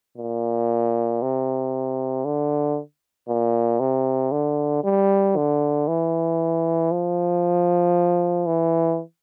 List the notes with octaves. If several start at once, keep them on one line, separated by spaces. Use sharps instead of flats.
A#2
C3
D3
A#2
C3
D3
G3
D3
E3
F3
E3